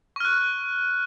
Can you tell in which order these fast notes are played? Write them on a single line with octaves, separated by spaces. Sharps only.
C#6 F6 F#6